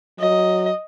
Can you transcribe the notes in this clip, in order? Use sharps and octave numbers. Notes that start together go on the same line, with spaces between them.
F#3 D#5